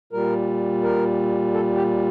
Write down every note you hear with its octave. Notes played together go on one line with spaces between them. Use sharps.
A#2 G3 A#4
A#4
A4
G4